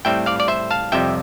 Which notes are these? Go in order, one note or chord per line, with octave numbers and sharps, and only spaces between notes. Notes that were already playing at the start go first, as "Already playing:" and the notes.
A2 G3 C4 E5 G5
D5 F5
D5
C5 E5
F5 A5
F2 C3 G3 E5 G5